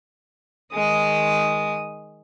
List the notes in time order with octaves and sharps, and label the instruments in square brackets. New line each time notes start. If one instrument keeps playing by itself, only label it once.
[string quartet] D#3 G#3 D#6